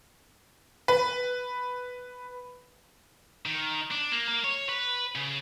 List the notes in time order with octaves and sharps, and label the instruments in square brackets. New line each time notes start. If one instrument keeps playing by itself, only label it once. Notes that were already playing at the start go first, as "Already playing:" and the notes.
[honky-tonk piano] B4
[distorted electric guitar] D#3
D4
A#3
A#3
C#5
B4
C#3